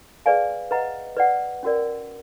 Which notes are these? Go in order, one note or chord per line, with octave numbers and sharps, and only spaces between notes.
G#4 B4 D5 F5 G#5
B4 D#5 F#5 A#5
B4 D5 F#5
C#4 F#4 A#4 D5